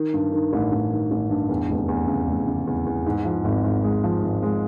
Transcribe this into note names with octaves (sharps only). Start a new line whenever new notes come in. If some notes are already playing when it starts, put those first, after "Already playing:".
Already playing: D#3
G2
D#3
A1
A1
D#3
A1
G2
E2
F1
E2
C#3
F1
C#3
E2
E2
G#2
F3
G#1
G#1
G#3
F3
G#1
G#3